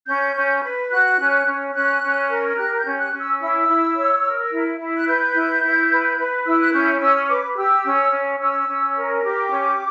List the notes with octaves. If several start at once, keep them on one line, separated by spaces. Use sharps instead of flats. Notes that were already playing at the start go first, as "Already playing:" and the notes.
C#4 G6
C#4
B4
F#4 F#6
C#4
C#4
C#4 F#6
C#4
A#4
G4 F#6
G6
C#4
F#6
C#4
E6
E4 E6
E4
C#5
A#4
E4
E4
F#6
B4 G6
E4
E4
B4
B4
E4 E6
F#6
C#4 G6
C#4 E6
B4 D6
G4 E6
C#4
C#4
C#4 E6
C#4
A#4
G4 D6
C#4